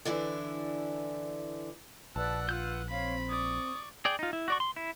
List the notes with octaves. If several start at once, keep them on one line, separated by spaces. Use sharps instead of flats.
D3 E3 D4 E4
A#1 B4 D5 F#5 A5 E6
F4 B4 E6 G6
C4 C#5 F5 B5
D5 C#6 D#6
G#4 D5 G5
D#4 F4
E4
F#4 D5 C#6
C6
E4